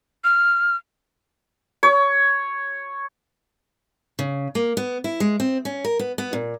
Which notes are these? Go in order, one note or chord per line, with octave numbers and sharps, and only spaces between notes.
F6
C#5
C#3
A#3
B3
E4
G#3
C4
C#4
A#4
B3
B3
A#2